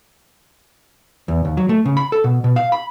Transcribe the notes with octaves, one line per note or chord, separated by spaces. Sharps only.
E2
D#2
F#3
A3
C#3
B5
A4
B2
B2
F5
B5